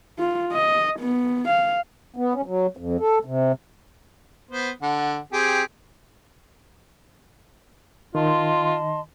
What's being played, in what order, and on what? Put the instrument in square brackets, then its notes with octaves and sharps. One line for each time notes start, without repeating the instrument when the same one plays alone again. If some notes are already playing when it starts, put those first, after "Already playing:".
[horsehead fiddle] F4
D#5
B3
F5
[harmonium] B3
C#4
F#3
F2
A4
C3
[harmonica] B3 C5
D3 F#5
C4 G4 G#4
[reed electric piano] D#3 [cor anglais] F4 [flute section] D#5 A5 C6